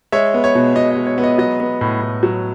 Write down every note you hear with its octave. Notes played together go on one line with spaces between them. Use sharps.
G#3 C#5 E5
B3
C#5
B2
B2 D#5
D#5
G#3
C#5
B3
D#5
F#3 D#5
B3
A2
A2
F#3